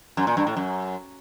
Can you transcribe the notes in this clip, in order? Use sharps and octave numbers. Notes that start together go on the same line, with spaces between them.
F#2
A#2
G2
A2
F#2